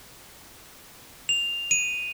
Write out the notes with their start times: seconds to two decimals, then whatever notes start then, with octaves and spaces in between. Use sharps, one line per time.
1.29 F7
1.71 D#7